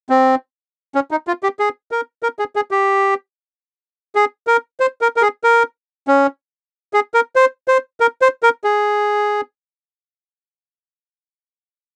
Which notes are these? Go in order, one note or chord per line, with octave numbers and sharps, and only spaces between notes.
C4
C#4
D#4
F4
G4
G#4
A#4
A#4
G#4
G#4
G4
G#4
A#4
C5
A#4
A#4
G#4
A#4
C#4
G#4
A#4
C5
C5
A#4
C5
A#4
G#4